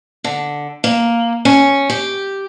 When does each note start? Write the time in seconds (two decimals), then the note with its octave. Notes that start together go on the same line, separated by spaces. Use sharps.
0.24 D3
0.84 A#3
1.45 C#4
1.90 G4